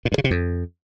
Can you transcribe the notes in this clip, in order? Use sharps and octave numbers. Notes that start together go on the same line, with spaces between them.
A#2
G2
C#3
C3
F2